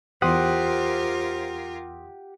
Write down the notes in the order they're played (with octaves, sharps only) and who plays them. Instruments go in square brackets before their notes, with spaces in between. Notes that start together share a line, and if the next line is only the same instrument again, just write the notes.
[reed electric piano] E2 C6 D#6 [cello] F4 A#4 [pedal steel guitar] G4 F#5 [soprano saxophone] C5